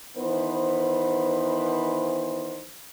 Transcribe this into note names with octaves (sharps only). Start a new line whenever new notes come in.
D#3 E3 B3 B4 C5